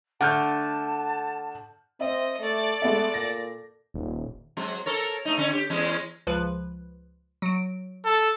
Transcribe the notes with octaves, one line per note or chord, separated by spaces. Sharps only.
D3 A3 F#5 A5 F6 G6
C4 D#5 E5
A3 A4 D5
G#3 A3 B3 E5
A#2 A#6
D#1
F#3 G#3 C4
A4 A#4 C#5
A3 D#4
D3 C#4
G4
E2 G#3 C#4
C#2 F3 B4
F#3 D7
A4